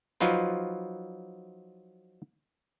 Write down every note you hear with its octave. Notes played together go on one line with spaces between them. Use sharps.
F3 F#3 D#4 F4 B4